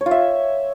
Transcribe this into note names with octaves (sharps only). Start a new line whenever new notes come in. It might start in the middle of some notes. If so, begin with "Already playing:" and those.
C#5
F4
E5